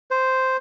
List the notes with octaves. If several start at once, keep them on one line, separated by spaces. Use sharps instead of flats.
C5